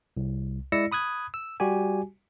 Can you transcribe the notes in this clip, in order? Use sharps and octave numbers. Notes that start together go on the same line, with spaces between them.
C2
G#3 E4 D5 E6 A#6 C#7
B5 D#6 F#6 G#6
E6
G3 F#4 G4 G#5